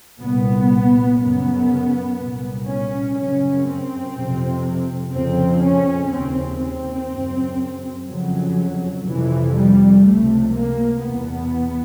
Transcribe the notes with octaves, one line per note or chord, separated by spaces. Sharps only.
C2 A#2 B3
F#2 C#3 B3
C2 A#2
C#4
F#2 C#3 C#4
C4
F2 C3
F2 C#3 C4
C#4
D#2 C#3 C4
C4
F#2 C#3
F2 C#3 F#3
F2 C3 E3
G3
C#2 C3 A3
A#3
E2 B2 B3